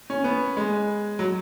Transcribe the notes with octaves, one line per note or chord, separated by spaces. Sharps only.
C#4
B3
G#3
F#3